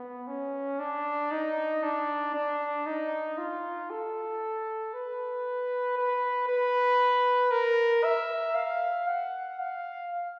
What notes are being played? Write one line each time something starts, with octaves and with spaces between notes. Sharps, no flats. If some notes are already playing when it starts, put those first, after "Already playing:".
Already playing: B3
C#4
D4
D#4
D4
D4
D#4
F4
A4
B4
B4
B4
A#4
E5
F5
F#5
F5